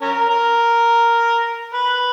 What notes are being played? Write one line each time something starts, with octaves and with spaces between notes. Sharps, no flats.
C#4 A#4
A#4
B4